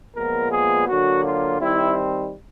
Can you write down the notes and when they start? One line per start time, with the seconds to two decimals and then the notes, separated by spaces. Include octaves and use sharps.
0.15 A#2 F3 G#3 B3 A#4
0.52 G#4
0.89 D3 F#3 A#3 F#4
1.25 F4
1.60 D#3 G3 C4 E4